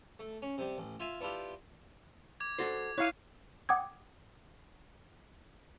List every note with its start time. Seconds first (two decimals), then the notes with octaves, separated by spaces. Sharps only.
0.19 A3
0.42 C#4
0.58 C3 G3
0.78 A1
1.00 F4 E5 F5 G#5
1.21 B3 D4 E4 F4 G4
2.40 D6 G#6
2.58 F#4 A4 C5
2.98 E4 C#5 F5 F#6 C7 D#7
3.69 F#5 G5 D6 D#6 G#6